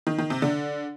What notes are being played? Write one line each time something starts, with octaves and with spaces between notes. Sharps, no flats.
D#3
D#3
C3
D3